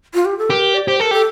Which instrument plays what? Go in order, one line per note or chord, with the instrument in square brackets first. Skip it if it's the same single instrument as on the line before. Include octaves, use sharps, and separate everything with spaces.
[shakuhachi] F4
G4
A4
[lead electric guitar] G4 [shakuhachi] A#4
[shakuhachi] D5
[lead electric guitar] G4 [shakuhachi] C5
[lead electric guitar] A4 [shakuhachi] A#4
[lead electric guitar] G4 [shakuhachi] A4